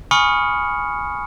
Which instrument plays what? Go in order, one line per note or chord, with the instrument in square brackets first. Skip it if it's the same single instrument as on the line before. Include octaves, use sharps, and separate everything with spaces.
[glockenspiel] G#5 B5 C#6 D#6 F6 C#7